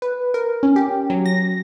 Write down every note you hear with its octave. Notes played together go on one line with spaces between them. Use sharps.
B4
A#4
C#4
G4
F#3
A#6